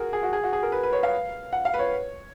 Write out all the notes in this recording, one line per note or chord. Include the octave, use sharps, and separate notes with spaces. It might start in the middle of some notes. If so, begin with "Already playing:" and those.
Already playing: F#4 G#4 A#4
G#4
F#4
G#4
F#4
G#4
A#4
B4
B4
C#5
F5
F#5
F5
B4
C#5